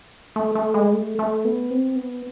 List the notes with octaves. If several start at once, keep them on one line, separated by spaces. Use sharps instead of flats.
A3
A3
G#3
A3
A3
B3
C4
B3